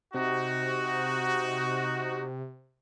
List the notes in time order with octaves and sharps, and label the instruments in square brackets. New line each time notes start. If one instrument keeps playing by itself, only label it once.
[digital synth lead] C3 [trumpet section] D#4 F#4